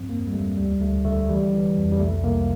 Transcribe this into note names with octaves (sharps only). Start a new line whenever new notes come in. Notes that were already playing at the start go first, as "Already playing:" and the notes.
Already playing: G2 F3 C4
E2 A#3
G3
E2 A3
D2 G3
D2 A3
D3 A3
E3 G3
E3
F2
G3
C2 A3
C2 A#3